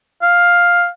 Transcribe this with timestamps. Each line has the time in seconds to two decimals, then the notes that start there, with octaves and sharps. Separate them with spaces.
0.22 F5